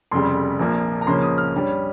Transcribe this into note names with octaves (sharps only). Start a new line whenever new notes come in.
F1 F2 C#3 G3 C6
A#1 A#2 F3 A#3
A#5
C#2 C#3 F3 A#3 C#4 C6
D#6
F6
G2 G3 C#4